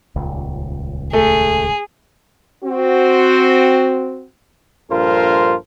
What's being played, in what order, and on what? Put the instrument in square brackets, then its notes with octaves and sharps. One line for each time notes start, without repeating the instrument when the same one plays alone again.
[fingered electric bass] D#1 C#2
[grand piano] A3 [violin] G#4
[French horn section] C4 F#4
[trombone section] A#1 G2 F4 A4 A#4 C5